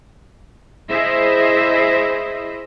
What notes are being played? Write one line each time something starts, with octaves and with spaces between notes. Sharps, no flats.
E4 G#4 C5 D#5 E5